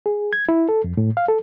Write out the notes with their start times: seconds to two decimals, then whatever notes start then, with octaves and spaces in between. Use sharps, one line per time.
0.06 G#4
0.33 G#6
0.49 E4
0.69 A4
0.84 F2
0.97 A2
1.17 F5
1.28 A4